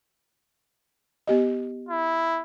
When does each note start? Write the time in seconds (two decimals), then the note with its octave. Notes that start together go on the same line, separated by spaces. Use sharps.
1.27 B3 G4 D#5
1.89 E4